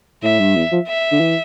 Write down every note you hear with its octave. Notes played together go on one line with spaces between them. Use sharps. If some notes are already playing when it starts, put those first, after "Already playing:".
A2 E5
G2
E2
F3
E5
D3
E3